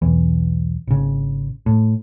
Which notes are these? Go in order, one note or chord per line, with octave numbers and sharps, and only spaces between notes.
B1 E2 E3
G#1 C#3
A2